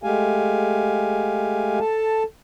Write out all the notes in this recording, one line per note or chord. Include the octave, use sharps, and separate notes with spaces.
G#3 A3 G4 F5 G#5
A4 A5